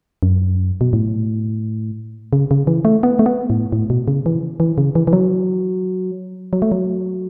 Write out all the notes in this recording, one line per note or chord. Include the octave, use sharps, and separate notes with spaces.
F#2
B2
A2
C#3
C#3
E3
A3
B3
A3
B3
A2
A2
B2
C#3
E3
E3
C#3
E3
E3
F#3
F#3
A3
F#3